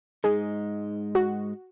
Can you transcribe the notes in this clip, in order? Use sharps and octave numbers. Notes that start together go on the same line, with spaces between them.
G#2 G#3 D#4 G#4
F#4